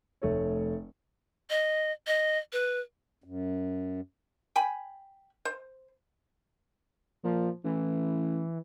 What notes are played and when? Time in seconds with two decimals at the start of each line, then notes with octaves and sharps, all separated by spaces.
0.22 F1 A3 C#5
1.50 D#5
2.07 D#5
2.53 B4
3.24 F#2
4.56 G5 G#5 B5
5.45 C5
7.24 A#2 F3
7.64 A1 E3